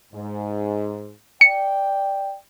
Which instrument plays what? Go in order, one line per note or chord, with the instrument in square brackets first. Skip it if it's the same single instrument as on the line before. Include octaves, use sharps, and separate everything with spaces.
[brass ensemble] G#2
[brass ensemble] D5 G5 [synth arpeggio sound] C#7